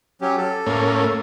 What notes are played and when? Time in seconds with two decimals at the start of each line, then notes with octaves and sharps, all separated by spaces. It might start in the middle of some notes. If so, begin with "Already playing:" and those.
0.22 F#3 C#4 G4
0.37 A4
0.66 A2 A#3 C#4